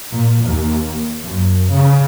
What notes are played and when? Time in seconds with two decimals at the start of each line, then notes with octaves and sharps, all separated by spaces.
0.14 A#2
0.46 D#2
1.23 F#2
1.73 C#3